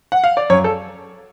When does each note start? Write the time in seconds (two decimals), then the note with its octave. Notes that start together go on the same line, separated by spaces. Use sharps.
0.12 F#5
0.24 F5
0.37 D5
0.50 F#2 C#5
0.64 A4